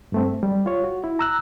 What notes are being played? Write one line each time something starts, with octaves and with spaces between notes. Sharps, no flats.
G2 A3 C4
G3
F4 C#5
F#4
E4
A#5 E6 F#6